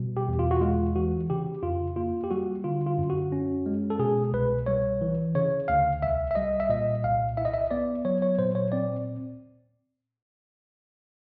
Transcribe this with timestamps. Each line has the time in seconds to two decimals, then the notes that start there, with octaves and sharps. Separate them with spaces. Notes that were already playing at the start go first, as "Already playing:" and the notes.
Already playing: B2 G3
0.17 G4
0.28 E2
0.39 F4
0.51 F#4
0.61 G#3 F4
0.96 E3 F#4
1.30 C#3 G4
1.63 F2 F4
1.96 A#3 F4
2.24 G4
2.31 G3 F#4
2.64 D3 F4
2.87 F4
2.98 F#2
3.10 F#4
3.32 C#4
3.66 G#3
3.90 A4
3.99 B2 G#4
4.33 C2 B4
4.66 G3 C#5
5.01 E3
5.35 C#3 C#5
5.68 D2 F5
6.02 C2 E5
6.31 E5
6.35 G3 D#5
6.60 E5
6.69 A#2 D#5
7.04 C2 F5
7.37 E4 E5
7.45 D#5
7.53 E5
7.71 B3 D5
8.05 F#3 C#5
8.22 C#5
8.39 A#2 C5
8.55 C#5
8.72 C4 D5